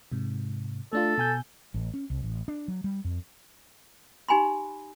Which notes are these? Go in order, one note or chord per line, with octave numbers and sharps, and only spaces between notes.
G#2 C3
A3 D4 F4 A4
B2 G#5 G6
A1
C#4
C2
A1
D4
F#3
G3
F2
D#4 G4 G#5 B5 C6